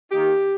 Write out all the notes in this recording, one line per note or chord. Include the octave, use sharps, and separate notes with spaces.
D#3 A#3 D#4 G4